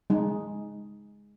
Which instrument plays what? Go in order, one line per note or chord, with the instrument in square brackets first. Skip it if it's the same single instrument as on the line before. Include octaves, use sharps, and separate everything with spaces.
[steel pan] G#3 D#4